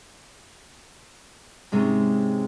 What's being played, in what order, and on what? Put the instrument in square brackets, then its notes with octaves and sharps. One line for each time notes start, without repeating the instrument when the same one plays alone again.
[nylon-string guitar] G#2 C3 G#3 C#4